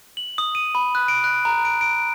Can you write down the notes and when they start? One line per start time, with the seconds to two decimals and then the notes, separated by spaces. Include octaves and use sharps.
0.17 F#7
0.38 D#6
0.55 D#7
0.75 B5
0.95 F#6
1.08 D7
1.24 F#6
1.45 A#5
1.65 D7
1.81 D7